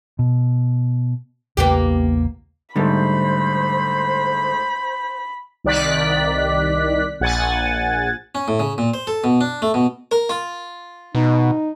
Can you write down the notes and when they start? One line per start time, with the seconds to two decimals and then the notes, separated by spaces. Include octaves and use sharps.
0.19 B2
1.57 A#1 E2 C#3 A#3 B3 G4
2.76 G#2 D3 G3 A3 A4 C5 B5
5.64 C2 D#3 D5 F#6 B6
7.20 A#1 F#5 G#5 A6
8.35 C#4
8.48 A2
8.59 C#3
8.78 A#2
8.94 C5
9.07 A4
9.24 B2
9.41 D4
9.62 A3
9.74 B2
10.11 A#4
10.29 F4
11.15 B2 D#4